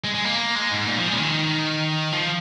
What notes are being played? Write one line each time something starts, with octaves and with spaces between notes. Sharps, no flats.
G#3
G#3
A#3
G#3
G#2
A#2
F3
G#3
C#3
D#3
F3